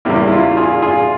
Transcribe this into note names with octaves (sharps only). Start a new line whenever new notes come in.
E2 C#3 G3 A#3 E4
E4
F4
F4 G#4
F4 G#4